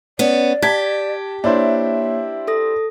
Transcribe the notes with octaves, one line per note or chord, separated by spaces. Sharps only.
B3 C#4 D5
G4 A5 G#6 B6
A#3 D4 E4 C5 C#5 E5
A4 D#6 A#6